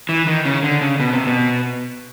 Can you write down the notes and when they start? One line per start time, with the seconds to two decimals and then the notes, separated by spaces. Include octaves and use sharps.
0.09 E3
0.27 D#3
0.45 C#3
0.63 D3
0.81 C#3
1.00 B2
1.13 C3
1.27 B2